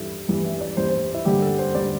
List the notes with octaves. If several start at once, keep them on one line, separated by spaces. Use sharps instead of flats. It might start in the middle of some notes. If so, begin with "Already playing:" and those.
Already playing: G2 E3 G3 E4 A4
G2 E3 G3
E5
D5
G2 E3 G3 C5
C5
E4
G2 D3 G3 G4
A4
C5
D3 G3 D5